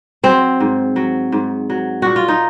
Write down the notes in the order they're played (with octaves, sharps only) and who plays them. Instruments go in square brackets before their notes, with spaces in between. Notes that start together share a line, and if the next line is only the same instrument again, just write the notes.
[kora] F#3 C4
G#2
F#3
G#2
F#3
A#2 F#4
F4
D#4